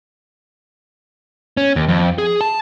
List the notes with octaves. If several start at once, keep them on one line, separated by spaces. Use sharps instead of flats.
C#4
D#2
F2
G#4
A5